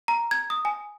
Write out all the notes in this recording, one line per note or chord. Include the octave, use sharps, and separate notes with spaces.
A#5
G#6
D#6
G#5